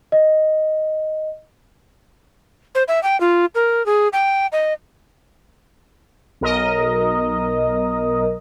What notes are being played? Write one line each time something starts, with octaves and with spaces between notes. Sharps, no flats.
D#5
C5
E5
G5
F4
A#4
G#4
G5
D#5
B1 A#4 D#5